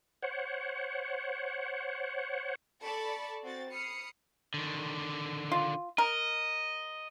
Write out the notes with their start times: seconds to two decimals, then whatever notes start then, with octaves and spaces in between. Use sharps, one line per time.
0.23 C5 C#5 F#5
2.83 A4 D5 A5 B5 C#6
3.43 C4 F#4 A6
3.72 B5 D#6 F6 C7 C#7
4.54 D3 D#3
5.52 F4
5.98 A#4 D#5